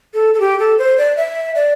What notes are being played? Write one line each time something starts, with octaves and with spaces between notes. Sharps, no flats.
A4
A4
G4
A4
C5
D5
E5
D5